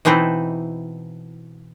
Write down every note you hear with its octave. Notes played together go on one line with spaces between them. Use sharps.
B2 E3 C4 D#4 E4